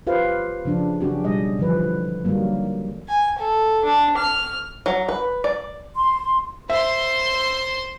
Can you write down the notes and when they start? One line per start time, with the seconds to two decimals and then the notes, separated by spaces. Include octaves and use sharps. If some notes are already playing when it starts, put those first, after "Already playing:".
0.07 F4 G4 B4 C5 F5
0.65 C#3 F3 D4
1.01 C#3 F#3 C#4 D4 F#4 G4
1.24 B2 G3 D#5
1.59 D3 E3 F3 B4
2.25 D3 D#3 F#3 G3 A#3
3.08 G#5
3.38 A4
3.85 D4
4.17 F6
4.86 F#3
5.08 B4
5.44 D5
5.95 C6
6.70 C5 E5 C6